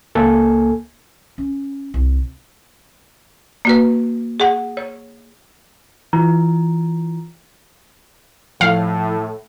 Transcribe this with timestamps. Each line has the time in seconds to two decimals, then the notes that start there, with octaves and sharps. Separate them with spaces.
0.15 C#2 A#3 A4 G#5
1.38 C#4
1.94 C2
3.65 A#3 F#4 B4
4.40 G#4 F#5
4.77 C#5
6.13 E3 F4 A#5
8.61 A2 F3 F5